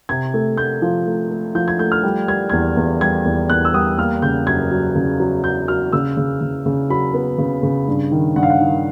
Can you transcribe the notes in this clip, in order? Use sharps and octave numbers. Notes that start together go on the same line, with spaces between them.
C3 G#6
A3
A3 G6
F3
A3
A3
F3 G6
G#6
A3 G6
F6
G3
G3 G#6
E2 G#6
E2
G3 G#6
E2
E2 F#6
E6
G3 D#6
A#3 F6
C#3 G6
F#2 G#6
F#3
C#3
F#3
F#3 G6
F#3 F6
C#3 E6
C#3
C#3
C#3
F#3 B5
B3
C#3
C#3
G2
D#3
G2 F#5
F5
F#5
D#3